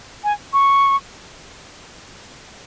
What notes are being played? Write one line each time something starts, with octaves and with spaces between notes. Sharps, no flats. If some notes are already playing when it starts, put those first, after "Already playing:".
G#5
C#6